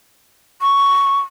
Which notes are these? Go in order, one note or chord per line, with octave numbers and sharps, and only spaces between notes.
C#6